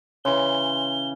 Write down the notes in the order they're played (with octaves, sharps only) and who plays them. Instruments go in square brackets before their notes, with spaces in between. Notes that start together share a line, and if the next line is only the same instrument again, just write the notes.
[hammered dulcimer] C#3 E3 [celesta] C#5 C6 [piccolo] G7